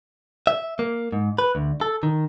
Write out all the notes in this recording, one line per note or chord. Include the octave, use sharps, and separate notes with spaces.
E5
A#3
G#2
B4
D2
A4
D#3